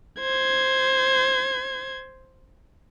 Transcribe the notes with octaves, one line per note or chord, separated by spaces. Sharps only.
C5 G#6